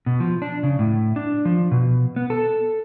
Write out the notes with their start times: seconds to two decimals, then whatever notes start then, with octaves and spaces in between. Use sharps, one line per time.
0.06 B2
0.20 F3
0.42 D4
0.63 C#3
0.79 A2
1.16 D4
1.45 F3
1.71 B2
2.16 B3
2.30 A4